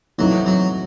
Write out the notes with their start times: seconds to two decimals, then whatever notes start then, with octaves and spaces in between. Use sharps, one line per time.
0.18 E3 F#3 A3 C4 D#4
0.46 F#3